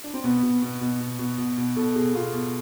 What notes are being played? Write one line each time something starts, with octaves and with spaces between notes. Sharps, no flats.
D4
C4
B2 B3
B2
B2
B2
B2
B2
B2
B2
B2 A4
B2 G#4
B2 F4
B2